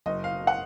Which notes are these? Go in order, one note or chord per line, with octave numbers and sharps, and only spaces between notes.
F#1 D#5
F5
F#5